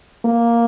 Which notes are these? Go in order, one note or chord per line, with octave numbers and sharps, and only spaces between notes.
A#3